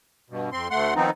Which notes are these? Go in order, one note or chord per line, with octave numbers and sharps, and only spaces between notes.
G2 B2
F2 C4 C6
D2 A3 F#5 C6
D#3 F3 B3 C4 D#4